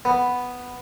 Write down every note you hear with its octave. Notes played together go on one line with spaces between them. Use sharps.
B3